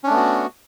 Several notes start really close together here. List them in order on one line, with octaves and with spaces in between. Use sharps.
C#4 D4 A3 B3 F#4